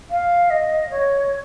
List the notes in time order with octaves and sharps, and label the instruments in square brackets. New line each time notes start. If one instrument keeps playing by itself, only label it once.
[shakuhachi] F5
D#5
C#5